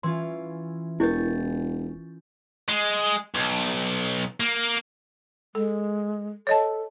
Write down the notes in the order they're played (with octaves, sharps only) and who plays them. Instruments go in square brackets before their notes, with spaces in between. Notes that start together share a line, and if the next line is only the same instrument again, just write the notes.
[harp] E3 C#4 F4 [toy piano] C6
[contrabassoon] E1 [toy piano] E4 A#4 [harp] C#6 G6 A6
[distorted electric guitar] G#3
B1
A#3
[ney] G#3 [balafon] A4
[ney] A4 [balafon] C#5 D#5 A5